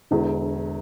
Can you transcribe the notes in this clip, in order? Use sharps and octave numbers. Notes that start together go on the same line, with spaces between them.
E1 E2 D3